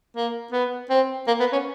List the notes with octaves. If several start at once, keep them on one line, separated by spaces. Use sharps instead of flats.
A#3
B3
C4
A#3
B3
C#4